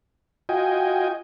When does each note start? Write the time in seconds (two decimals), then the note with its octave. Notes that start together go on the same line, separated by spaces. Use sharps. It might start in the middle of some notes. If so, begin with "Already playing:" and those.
0.49 F4 F#4 D#5 G5 G#5